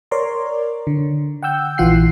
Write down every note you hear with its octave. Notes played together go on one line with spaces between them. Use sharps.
A#4 C#5 D5 A#5 C6 D6
D3
F#5 G5 E6 G6
A#1 E3 F4 F#5 F#6 C7